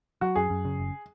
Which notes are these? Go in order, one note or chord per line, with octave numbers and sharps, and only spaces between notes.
F#3 F#4
F#2 G#4
F#2
C#3
F#1